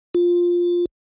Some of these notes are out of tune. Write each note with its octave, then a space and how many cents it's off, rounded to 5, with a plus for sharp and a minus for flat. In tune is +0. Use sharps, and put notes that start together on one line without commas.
F4 +5